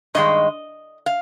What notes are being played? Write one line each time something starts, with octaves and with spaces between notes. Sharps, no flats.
G2 D#3 G#3 D#5
F5